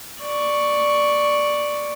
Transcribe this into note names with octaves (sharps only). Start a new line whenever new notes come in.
D5 C#6